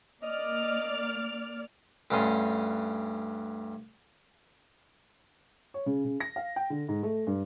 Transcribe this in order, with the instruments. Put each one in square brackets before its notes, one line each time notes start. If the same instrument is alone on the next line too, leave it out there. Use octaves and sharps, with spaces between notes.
[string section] A#3 D5 F6 [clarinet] D#5
[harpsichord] D2 G2 C#4 C6 D#6
[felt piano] C#5
C#3
C#3
A#6
F5
G5
D3
G#2
A3
G2